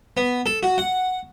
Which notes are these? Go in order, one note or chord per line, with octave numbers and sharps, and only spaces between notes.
B3
A4
F#4
F#5